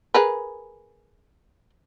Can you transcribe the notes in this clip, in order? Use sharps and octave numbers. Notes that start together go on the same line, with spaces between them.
G#4 A#4 B4